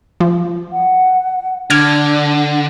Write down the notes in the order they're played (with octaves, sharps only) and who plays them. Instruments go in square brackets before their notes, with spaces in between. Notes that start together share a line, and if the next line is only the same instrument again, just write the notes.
[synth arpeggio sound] F3
[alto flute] F#5
[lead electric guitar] D3 [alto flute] D4 [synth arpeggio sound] D6 F6 G#6